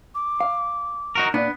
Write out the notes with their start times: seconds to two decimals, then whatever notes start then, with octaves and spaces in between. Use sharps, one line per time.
0.14 D6
0.40 F5
1.15 D#4 F#4 A#4
1.34 A#2 B3 D4